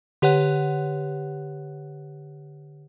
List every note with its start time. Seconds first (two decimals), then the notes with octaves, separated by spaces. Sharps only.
0.22 D3 G4 B4 C#5 F#5 F#6